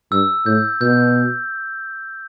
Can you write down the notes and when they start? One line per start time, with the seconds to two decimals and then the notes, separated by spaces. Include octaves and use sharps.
0.12 G2 E6
0.46 A2 G6
0.81 B2 G6